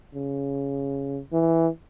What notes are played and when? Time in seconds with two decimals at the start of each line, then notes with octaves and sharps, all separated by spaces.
0.14 C#3
1.32 E3